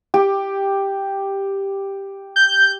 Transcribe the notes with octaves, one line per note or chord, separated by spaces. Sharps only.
G4
G6